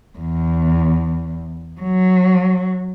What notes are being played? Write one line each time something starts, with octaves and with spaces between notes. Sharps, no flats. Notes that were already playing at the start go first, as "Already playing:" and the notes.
E2
F#3